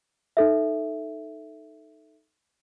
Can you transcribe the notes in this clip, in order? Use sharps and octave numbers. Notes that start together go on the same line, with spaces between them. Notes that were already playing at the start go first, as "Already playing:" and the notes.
D#4 A4 E5